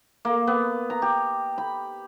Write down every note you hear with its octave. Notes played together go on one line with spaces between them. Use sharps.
A#3
B3
A#5
G4
B5